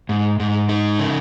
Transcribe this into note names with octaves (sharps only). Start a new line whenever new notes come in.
G#2
G#2
D#4
C#3